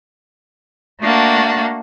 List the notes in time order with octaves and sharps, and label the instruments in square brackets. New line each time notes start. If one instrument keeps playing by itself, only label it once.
[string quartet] A3 A#3 D4 F#4